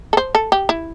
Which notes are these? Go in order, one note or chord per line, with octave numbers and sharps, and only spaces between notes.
A4
C5
A4
G4
E4